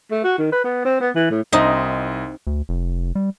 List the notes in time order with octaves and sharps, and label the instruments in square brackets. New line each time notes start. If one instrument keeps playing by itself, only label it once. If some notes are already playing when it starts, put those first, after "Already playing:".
[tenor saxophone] A3
F#4
D#3
B4
B3
C4
B3
E3
A2
[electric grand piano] C2 D#5 E5 [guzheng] C4 D#4
[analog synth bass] D2
F1
G3